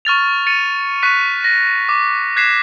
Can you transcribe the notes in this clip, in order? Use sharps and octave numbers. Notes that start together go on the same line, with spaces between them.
C#6 F6 A6 F7
A6 C#7 D#7
C#6 F#6 B6 D#7
A#6
D6
F#6 G#6 B6 C7 E7